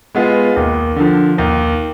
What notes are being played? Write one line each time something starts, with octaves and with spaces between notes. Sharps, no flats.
G#3 B3 F4
D#2
D3 F3
D#2